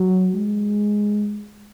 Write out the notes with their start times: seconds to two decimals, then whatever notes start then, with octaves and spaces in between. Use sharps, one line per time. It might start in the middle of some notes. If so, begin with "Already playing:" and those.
Already playing: F#3
0.35 G#3